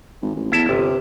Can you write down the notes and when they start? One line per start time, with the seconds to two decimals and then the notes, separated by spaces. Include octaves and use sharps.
0.22 G#1
0.35 A1
0.52 E2 E4 E5 A5
0.69 G1 C3